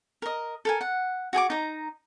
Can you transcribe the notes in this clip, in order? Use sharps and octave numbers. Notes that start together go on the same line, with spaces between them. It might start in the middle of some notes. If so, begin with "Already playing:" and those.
A#4 D#5
A4 A#4 G#5
F#5
F#4 G#4 G#5 D6
D#4 A#5